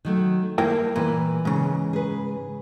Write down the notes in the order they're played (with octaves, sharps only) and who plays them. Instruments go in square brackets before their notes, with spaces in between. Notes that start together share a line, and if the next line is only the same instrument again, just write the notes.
[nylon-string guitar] D#3 F#3 A3
[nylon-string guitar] G3 A#3 [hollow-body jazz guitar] E4 A#4 G5
[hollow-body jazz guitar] A#2 [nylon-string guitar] E3 B4
[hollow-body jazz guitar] G#2 C#3
[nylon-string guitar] G#4 B4